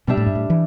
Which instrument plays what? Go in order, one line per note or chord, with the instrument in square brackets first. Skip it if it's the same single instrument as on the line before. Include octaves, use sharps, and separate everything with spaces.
[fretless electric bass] B2 [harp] G3 D4 G4 E5
[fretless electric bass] A2
G2
A2
E3